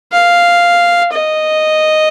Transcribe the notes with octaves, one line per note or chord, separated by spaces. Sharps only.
F5
D#5